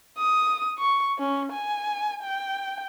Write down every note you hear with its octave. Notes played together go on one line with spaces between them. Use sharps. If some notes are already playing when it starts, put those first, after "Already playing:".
D#6
C#6
C#4
G#5
G5